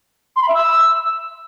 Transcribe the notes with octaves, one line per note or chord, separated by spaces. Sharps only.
C6
B5
E5
E6